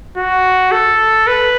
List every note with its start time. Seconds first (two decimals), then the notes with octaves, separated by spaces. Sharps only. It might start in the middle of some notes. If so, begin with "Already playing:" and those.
0.18 F#4
0.72 A4
1.27 B4